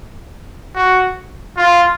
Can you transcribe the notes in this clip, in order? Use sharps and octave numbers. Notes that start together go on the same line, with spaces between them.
F#4
F4